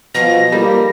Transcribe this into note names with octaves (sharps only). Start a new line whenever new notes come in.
B2 F3 F4 A#6
G3 A#3 D#4 A4